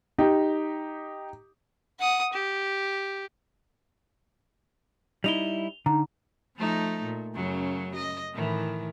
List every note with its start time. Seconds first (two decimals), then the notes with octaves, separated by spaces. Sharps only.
0.18 D#4 G4
2.00 F#5 D#6
2.33 G4
5.24 G3 D#4 E4 F7 G7
5.86 D3 D#4 A#5
6.57 F3 A3 D#4
7.02 A#2
7.34 F#2 C#3 F#3
7.96 D#5
8.34 A2 D#3 E3